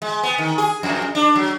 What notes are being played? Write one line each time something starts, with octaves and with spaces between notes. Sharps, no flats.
G#3
B3
D#3
G#4
F2
D4
F#3